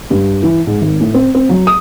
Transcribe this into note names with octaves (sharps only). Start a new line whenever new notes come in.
G2
E3
G#2
G#1
A2
C4
C4
F#3
D#6